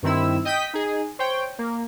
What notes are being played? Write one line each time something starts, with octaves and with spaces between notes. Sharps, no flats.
G2 D#3 C4 E4 E6
D#5 G5 D#6 G6 B6
D#4 G#4
C5 C#5 G5
A#3